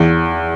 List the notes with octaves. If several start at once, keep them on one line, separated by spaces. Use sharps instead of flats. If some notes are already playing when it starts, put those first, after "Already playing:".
Already playing: E2